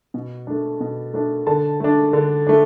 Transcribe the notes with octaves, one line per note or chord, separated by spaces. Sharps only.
B2
A3 D4
B2
A3 D4
D3 A5
A3 D4
D3
A3 D4